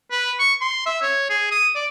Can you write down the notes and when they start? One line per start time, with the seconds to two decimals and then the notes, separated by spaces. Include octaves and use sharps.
0.11 B4
0.39 C#6
0.61 C6
0.86 E5
1.02 C#5
1.30 G#4
1.51 D#6
1.75 D5